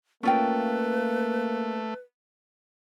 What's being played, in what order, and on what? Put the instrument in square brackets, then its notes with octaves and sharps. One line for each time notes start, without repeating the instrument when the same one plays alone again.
[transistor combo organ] A3 [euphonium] A#3 [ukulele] C#4 F4 G5 [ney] B4